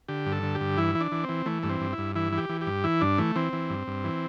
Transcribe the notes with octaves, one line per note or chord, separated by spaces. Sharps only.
D3 G4
G2
A4
D3
G4
G2
E3 E4
E3
D4
E3
C4
E3
E3 A3
G2 A3
C4
G2
E4
G2
E3 E4
E3
G4
E3
G4
G2
E3 E4
G2 D4
E3 A3
E3 C4
E3
G2
G2
E3